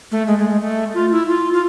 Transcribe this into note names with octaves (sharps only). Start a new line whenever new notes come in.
A3
G#3
G#3
G#3
A3
F4
E4
F4
F4